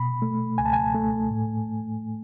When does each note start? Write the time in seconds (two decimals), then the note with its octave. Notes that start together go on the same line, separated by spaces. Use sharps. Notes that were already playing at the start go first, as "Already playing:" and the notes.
Already playing: B2 B5
0.22 A3
0.58 C#2 G#5
0.65 A5
0.73 G#5
0.94 A3
1.31 A2